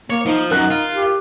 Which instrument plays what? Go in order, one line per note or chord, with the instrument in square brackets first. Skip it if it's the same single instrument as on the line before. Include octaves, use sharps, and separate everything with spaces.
[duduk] A#3 [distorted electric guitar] C#5
[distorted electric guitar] F3 [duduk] D#4
[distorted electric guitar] F#2 [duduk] D#4 [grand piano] A#4 F#6
[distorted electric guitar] F4
[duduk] G4